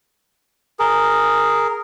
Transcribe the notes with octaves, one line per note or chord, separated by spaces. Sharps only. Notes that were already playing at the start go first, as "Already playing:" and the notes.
G#4 A#4